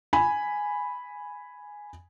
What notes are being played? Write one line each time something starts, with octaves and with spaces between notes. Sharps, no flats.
G#5 B5